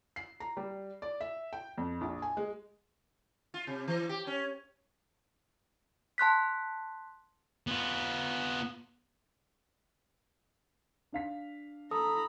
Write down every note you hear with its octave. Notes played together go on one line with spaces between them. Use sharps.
C7
A#5
G3
D5
E5
G5
F2
A#1
G#5
G#3
F4
C3
E3
G4
C#4
A5 C6 F#6 B6
B3 F4
D4 F5 B6
A4 A#5 B5 D#6